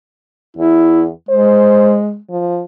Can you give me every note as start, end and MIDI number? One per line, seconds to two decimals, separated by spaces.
0.57 1.09 40
0.57 1.04 64
1.29 2.19 56
1.29 1.95 72
2.30 2.62 53